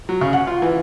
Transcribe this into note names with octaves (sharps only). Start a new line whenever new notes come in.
F#3
C#3
F#5
F4
E3